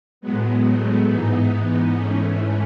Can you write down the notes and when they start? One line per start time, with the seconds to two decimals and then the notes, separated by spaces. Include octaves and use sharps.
0.21 A2 F#3 G#3 B3
0.65 A3
1.08 G#2 E3 B3 D#4
1.95 G#2 E3 A3 C#4